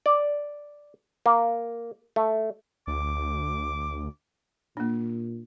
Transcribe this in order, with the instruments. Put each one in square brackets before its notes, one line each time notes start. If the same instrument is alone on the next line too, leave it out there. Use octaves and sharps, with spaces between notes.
[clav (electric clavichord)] D5
A#3
A3
[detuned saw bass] D2 [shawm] D6
[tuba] A#2 [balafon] A#3 D4